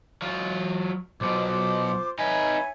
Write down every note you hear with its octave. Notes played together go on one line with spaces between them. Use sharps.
F#3 F4
B1 B2 F4 C5 D6
D#4 B4 C#5 E5 G#5